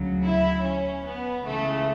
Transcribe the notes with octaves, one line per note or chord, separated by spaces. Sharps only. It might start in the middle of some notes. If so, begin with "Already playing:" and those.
Already playing: D2 C#3 F#3
E4
C#4
B3
C#2 C#3 E3 G#3 A3